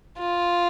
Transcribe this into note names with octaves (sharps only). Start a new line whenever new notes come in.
F4